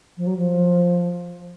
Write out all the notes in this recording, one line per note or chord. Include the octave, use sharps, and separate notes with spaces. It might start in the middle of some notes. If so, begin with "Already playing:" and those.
F3
F#3
F3